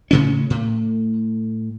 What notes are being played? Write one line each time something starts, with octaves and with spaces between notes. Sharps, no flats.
A2 C#3 C#4
A2